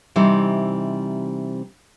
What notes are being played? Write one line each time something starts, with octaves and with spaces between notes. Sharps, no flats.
C3 E3 G3 C4 D#4